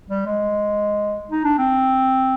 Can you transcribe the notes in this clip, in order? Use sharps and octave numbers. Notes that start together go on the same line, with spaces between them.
G3
G#3
D#4
D4
C4